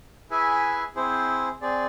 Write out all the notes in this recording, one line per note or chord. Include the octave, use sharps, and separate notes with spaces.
E4 G#4 B4 E5 G#5
C4 E4 G#4 C5
C4 G#4 D5